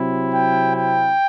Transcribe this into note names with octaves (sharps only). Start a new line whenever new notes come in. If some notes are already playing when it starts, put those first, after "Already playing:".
Already playing: C3 F#3 C4 E4
G5
G5